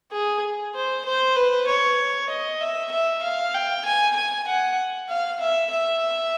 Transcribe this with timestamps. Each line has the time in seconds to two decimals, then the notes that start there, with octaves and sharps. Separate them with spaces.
0.12 G#4
0.75 C5
1.05 C5
1.36 B4
1.67 C#5
2.30 D#5
2.61 E5
2.91 E5
3.23 F5
3.54 G5
3.85 G#5
4.16 G#5
4.47 F#5
5.09 F5
5.41 E5
5.71 E5